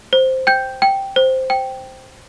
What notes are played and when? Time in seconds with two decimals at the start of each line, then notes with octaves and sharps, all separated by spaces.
0.13 C5
0.47 G5 G6
0.82 G5
1.16 C5
1.50 G5